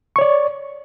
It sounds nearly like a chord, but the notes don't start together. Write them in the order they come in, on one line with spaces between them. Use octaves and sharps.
C#6 C#5 D5